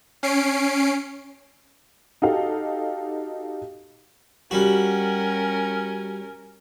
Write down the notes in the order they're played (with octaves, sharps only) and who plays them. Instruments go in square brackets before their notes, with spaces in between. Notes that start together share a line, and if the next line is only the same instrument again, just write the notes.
[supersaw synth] C#4 C7 D7
[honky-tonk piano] D#4 F#4 G4 A4 F5
[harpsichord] G3 F#4 [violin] C#4 A#4